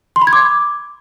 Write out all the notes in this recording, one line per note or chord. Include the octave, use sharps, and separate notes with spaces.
C6
B5
G#6
D6